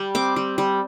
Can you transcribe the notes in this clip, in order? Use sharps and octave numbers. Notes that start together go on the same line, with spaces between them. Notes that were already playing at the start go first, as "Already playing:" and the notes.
Already playing: G3
C4 D6
G3
G3